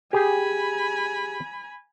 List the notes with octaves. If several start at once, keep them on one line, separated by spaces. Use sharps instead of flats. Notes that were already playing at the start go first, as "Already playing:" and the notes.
G4 G#4 G#5 B5